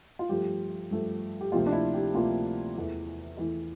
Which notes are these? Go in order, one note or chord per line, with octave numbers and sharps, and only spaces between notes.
F4
G2 F3 A3 G4
G2 F3 A3
G4
D2 C3 F3 A#3 F4
D4
E4
G4
D2 C3 F3 A#3 F4
E2 E3 A3
E2 E3 A3 E4